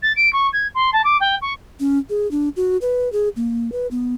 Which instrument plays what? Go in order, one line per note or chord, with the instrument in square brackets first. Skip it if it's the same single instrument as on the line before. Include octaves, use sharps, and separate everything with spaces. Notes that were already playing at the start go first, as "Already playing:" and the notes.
[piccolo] A6
D7
C#6
G#6
C6
A5
D6
G5
C#6
[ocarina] C#4
G#4
D4
F#4
B4
G#4
A#3
B4
B3